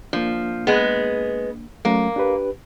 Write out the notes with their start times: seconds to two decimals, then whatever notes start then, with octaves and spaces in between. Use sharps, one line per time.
0.13 F3 A#3 D4
0.67 G#3 B3
1.85 F#3 A3 A#3 C#4
2.16 D4 G4 B4